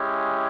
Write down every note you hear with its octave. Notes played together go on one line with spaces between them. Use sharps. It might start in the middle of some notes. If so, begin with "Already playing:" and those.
Already playing: G#3 C#4 E4 G4